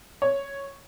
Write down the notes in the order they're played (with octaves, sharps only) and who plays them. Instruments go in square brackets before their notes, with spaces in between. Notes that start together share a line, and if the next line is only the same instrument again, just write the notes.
[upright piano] C#5